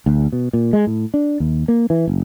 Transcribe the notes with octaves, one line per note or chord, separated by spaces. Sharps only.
D2
B2
A#2
G#3
A2
D4
D#2
A#3
E3
F#1